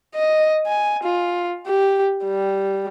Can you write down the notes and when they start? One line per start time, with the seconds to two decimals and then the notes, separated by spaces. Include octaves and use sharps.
0.15 D#5
0.67 G#5
1.03 F4
1.66 G4
2.25 G3